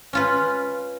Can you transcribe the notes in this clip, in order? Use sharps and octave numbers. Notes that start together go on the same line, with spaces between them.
C#4 F4 B4